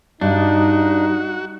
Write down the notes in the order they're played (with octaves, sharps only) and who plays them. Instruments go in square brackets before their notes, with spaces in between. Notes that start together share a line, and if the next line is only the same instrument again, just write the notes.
[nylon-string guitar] G2 G3 [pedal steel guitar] D4 [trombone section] D#4 [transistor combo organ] F#4